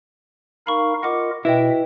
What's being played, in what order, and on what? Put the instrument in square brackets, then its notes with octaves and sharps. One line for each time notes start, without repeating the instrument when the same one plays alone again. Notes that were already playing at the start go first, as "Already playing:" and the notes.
[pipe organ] D#4 A#4 F5 [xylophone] B5 C#6
[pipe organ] F4 A#4 D#5 [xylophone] F#5 D6
[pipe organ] B2 E5 [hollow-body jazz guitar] E4 [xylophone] B4 D#5 G5